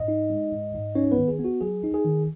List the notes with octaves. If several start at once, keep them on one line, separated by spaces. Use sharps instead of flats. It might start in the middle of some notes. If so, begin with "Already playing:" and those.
Already playing: G#2 D#5
D#4
G#3
G#2
G#2
C#4 D#4 C#5
B3 B4
D#3
G#4
B3
F#4
F#3 G#4
D#4
G#4
D#3